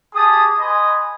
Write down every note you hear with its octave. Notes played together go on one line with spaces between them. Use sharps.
G4 G#4 A5 D#6
B4 D#5 G#5 B5 C6 D#6